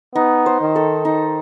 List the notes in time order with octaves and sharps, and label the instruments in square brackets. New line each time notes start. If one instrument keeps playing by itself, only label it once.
[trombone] B3 [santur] D#4
[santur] C5
[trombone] D#3
[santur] A4
[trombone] D#3 [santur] D#4